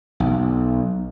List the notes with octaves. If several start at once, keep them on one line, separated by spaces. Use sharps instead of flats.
B1